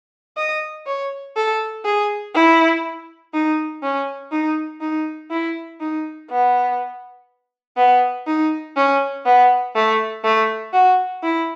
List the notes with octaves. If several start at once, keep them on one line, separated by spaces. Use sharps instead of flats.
D#5
C#5
A4
G#4
E4
D#4
C#4
D#4
D#4
E4
D#4
B3
B3
D#4
C#4
B3
A3
A3
F#4
E4